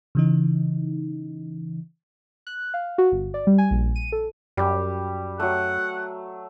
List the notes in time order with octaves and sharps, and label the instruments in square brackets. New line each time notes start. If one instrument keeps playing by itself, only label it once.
[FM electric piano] C#3 E3 D#4
[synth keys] F#6
F5
F#4
G1
D5
G3
G#5
A#1
D#7
A4
[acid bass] F#2 [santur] G3 G4
[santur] F#3 A3 [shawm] F#5